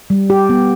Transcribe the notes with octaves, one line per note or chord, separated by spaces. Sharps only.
G3
G4
B3